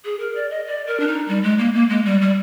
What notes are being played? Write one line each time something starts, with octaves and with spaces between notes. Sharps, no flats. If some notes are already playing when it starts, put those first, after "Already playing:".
G#4
A#4
D5
D#5
D5
A#4
D4
D#4
G3
G#3
A#3
A#3
G#3
G3
G3